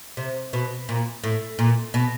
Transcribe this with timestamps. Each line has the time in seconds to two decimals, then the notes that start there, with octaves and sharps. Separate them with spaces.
0.17 C3
0.53 B2
0.89 A#2
1.24 A2
1.59 A#2
1.94 B2